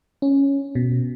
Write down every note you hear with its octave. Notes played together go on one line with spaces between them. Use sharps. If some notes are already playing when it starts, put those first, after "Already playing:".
C#4
B2